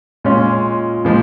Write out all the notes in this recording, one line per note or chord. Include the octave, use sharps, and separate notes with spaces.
A#2 G#3 C#4 F4
A#2 F3 G#3